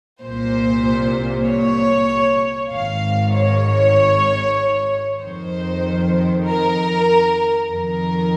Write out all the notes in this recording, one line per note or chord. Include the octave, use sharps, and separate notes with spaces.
C2 A#2 C5
C#5
G#1 G#2 D#3 F5
C#5
F2 D#3 C5
A#4
F2 D#3 A#4